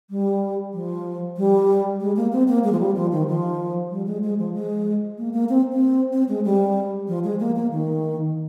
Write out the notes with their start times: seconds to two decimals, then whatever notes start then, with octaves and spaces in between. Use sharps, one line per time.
0.10 G3
0.74 F3
1.37 G3
2.01 G#3
2.17 A#3
2.32 C4
2.48 A#3
2.64 G#3
2.72 F3
2.80 G3
2.96 F3
3.12 D#3
3.28 F3
3.91 G3
4.06 G#3
4.23 G#3
4.39 F3
4.54 G#3
5.18 A#3
5.34 A#3
5.49 C4
5.73 C4
6.13 C4
6.29 G#3
6.45 G3
7.08 F3
7.24 G#3
7.40 A#3
7.56 A#3
7.71 D#3